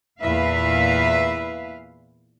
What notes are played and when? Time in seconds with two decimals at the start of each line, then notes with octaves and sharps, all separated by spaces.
0.20 E2 A#2 E4 B4 E5 F5